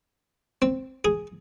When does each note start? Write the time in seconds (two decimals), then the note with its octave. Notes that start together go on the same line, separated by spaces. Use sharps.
0.62 C4
1.05 G#4